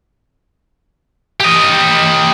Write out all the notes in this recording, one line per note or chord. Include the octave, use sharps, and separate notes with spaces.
G4 D#5